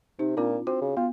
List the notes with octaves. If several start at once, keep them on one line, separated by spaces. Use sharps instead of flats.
C3 D#4
A#2 C4 D4 F4
C4 F#4
C#3
B3 F4